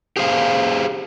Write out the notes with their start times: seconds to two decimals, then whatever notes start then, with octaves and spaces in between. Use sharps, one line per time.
0.17 G4 G#4 C5 F5